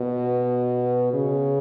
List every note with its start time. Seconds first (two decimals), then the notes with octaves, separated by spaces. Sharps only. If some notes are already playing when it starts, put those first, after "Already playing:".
Already playing: B2
1.13 C#3